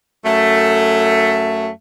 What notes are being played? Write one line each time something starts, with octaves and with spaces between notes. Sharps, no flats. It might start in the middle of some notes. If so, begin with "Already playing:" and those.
F#2 A3